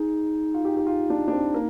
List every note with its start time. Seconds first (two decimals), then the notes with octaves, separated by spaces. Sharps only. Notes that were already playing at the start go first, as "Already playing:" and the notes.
Already playing: D#4 G#4
0.54 F4
0.65 G4
0.77 G4
0.87 F4
1.10 D4
1.28 D4
1.32 C4
1.54 A#3